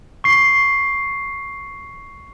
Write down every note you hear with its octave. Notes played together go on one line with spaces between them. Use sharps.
C#6 C7